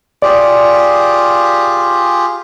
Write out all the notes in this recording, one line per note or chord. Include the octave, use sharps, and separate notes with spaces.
F4 G4 G#4 D5